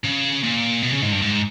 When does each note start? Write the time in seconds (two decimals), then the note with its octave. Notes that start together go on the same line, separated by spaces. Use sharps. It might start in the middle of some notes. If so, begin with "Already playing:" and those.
0.04 C#3
0.43 A#2
0.82 B2
0.93 C#3
1.02 G#2
1.12 G2
1.22 G#2